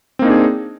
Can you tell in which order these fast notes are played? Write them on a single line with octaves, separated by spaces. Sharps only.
C4 A#3 D#4 D4 G#4